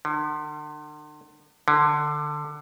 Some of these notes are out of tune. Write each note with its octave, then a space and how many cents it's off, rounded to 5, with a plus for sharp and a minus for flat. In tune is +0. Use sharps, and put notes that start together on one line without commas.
D3 +45
D3 +20